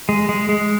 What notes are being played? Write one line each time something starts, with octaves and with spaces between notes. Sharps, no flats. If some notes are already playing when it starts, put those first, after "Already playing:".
G#3
G#3
G#3